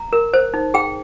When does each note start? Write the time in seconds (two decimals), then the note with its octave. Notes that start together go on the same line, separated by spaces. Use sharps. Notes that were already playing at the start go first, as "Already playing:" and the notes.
Already playing: A#5
0.13 A#4
0.34 C5
0.54 D#4
0.74 G#4 G5